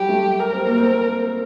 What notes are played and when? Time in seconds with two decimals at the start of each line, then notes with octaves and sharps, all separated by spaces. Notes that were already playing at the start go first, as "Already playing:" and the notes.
Already playing: F#3 G3 G4
0.09 A3
0.40 A#4
0.52 C4
0.65 A#3
0.78 C4